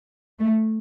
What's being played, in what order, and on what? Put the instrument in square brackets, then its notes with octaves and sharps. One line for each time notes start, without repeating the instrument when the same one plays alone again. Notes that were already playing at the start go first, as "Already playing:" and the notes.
[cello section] A3